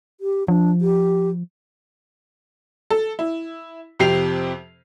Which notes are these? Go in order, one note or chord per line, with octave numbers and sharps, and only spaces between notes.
G4
F3 D4
G4
A4
E4
F2 C3 G4 C7 F7